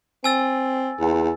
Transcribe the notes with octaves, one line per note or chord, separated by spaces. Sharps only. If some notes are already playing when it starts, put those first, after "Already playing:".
C4 G#5 E6 A6
E2